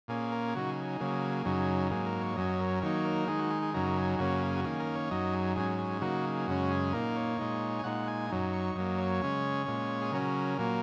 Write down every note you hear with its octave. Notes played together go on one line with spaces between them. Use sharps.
A#2 A#3 C#4 G#4
A#4
G#4
C#3 F#3 D#4 F#4
G#4
G#4
C#3 F#3 A#3
F#2 C#3 F#3 D#4
G#2 F#3 A#3 G#4
A#4
C#5
F#2 F#3 C#4 D#5
A#4
D#3 F#3 A#3 D#4 C#5
A#4
D#3 G#3 D#4 G#4
F#4
G#4
G#4
F#2 C#3 F#3 D#4 A#4
G#4
F#2 C#3 A#3 C#4 F#4
G#4
F#4
D#3 A#3 C#4 G#4
A#4
C#5
F#2 F#3 D#4 D#5
G#4
G#2 F#3 C#4 G#4
G#4
C#3 F#3 A#3 D#4 F#4
G#4
F#2 C#3 G#3 C#4 F#4
G#4
A#2 A#3 D#4 A#4
C#5
A#2 G#3 D#4
G#5
A#2 G#3 D#4 F#5
G#5
F#2 F#3 D#4
C#6
F#2 F#3 A#3 D#5
C#5
C#3 G#3 C#4
A#2 G#3 C#4
G#4
C#3 F#3 C#4 A#4
A#2 F#3 A#3